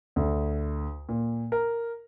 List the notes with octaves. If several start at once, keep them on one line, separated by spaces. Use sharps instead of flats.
D2
A#2
A#4